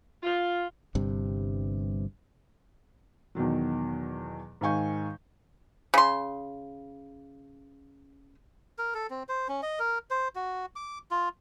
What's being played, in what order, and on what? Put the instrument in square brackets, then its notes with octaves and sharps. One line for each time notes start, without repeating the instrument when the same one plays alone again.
[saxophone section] F4
[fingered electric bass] G1 G2 C3
[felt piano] E2 B2 D#3 F#3
G#2 D#3 F5 G#5 C#6 G6
[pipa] C#3 C6
[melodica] A#4
A4
C4
C5
C#4
D#5
A#4
C5
F#4
D6
F4